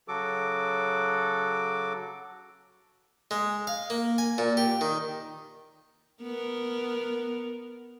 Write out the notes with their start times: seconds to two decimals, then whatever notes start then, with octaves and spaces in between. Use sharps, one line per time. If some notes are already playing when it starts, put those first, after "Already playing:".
0.08 C#3 F#3 F#4 A4 D6
3.31 G#3
3.67 F5
3.90 A#3
4.18 G#5
4.38 A#2
4.57 G4
4.81 D#3
6.22 B3 A#4